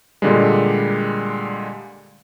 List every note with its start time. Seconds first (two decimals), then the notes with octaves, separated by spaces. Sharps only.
0.22 A#2 D3 G3 G#3